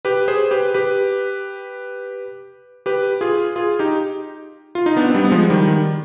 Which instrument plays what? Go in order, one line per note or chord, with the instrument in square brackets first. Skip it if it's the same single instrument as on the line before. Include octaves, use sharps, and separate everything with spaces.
[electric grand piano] G4 B4
G#4 C5
G4 B4
G4 B4
G4 B4
F4 G#4
F4 G#4
D#4 G4
F4
D#4
B3 D4
C4
G3 B3
B3
F3 G#3
D#3 G3
D#3